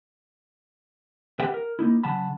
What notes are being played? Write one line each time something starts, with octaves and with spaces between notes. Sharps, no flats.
G4 B4 E5 F#5 G5
A#4
A#3 D#4 E4
C#3 F#3 F#5 A5 B5